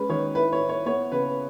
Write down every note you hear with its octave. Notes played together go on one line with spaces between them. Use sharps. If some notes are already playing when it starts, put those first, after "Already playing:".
Already playing: G#3 C#4 B4
D#3 C#5
E4 B4
C#5
E4
C#5
B3 C#5
C#3 B4